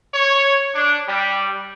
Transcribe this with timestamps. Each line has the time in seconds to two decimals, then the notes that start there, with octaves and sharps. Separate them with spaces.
0.14 C#5
0.75 D4
1.08 G3